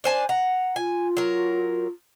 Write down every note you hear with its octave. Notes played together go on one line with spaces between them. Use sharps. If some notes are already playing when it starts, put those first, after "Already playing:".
D4 C5 G#5
F#5 A#5
F4 G#5
F#3 A#4